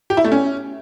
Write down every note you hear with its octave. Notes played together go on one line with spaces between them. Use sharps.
G4
E4
A3
C#4